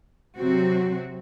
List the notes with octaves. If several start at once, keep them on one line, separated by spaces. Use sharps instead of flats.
C3 F#3 C4 F#4